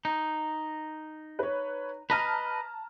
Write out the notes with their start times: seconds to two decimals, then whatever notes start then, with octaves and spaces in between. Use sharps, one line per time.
0.05 D#4
1.39 B4 C#5
2.10 B4 D#5 A5 A#5 F6